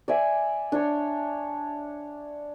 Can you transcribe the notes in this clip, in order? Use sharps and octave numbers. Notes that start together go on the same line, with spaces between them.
D5 E5 G#5
D4 C#5